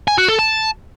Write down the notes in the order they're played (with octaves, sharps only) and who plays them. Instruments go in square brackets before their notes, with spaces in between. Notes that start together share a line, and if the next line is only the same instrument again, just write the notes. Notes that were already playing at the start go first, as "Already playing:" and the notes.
[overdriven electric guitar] G#5
F#4
A4
A5